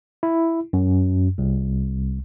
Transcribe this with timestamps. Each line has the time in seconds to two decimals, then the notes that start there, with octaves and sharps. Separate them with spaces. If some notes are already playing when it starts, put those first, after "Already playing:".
0.23 E4
0.73 F#2
1.38 C2